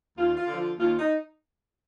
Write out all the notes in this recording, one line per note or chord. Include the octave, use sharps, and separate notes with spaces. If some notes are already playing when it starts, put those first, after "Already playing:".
D#2 F4
F4
D3 F3
F4
D#2 F4
D#4